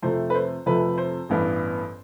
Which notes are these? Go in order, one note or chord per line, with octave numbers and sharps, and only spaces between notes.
F2 C3 F3 A3 C5
B4
C5
F2 C3 F3 A3 B4
C5
A1 G2 E3 B3